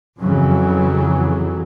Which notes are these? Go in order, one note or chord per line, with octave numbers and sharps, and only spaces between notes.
F2 C#3 E3 F#3